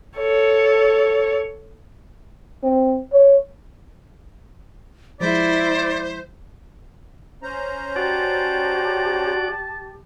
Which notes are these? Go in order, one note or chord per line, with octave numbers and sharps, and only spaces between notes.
A4 C#5
C4
C#5
F3 G#3 E4 C5 D5 B6
C#4 C5 A#5
F#4 G4 D5 A5